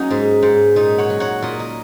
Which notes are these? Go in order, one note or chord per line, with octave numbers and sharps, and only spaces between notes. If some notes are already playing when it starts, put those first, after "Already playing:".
Already playing: F#3 A#3 C#4 D#4 F#4 A#4
G#2
G#2
A#2 D#4
C#5 F#5
F#3
C#5 F#5
A#2 A#4 D#5
A#4 D#5